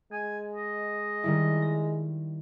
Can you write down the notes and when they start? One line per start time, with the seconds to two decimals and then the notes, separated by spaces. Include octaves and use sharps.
0.12 G#3 G#5
0.54 D#5
1.24 D#3 G3 E4
1.62 A#6